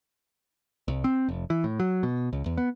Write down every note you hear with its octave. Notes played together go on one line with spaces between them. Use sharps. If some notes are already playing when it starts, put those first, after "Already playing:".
C2
C4
F1
E3
A2
F#3
B2
C#2
E2
B3